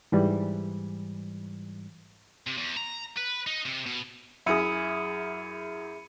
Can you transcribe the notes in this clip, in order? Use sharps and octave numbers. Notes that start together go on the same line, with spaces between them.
G#2 E3 G3
C3
E2
A#5
B4
D#4
C3
B2
F#2 E4 G#4 E5 B5 D#6 C#7 D#7